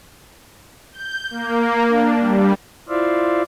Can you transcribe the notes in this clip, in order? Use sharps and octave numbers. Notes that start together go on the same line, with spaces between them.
G6
A#3
D4
G3
E4 F4 C5 D5 E5 F5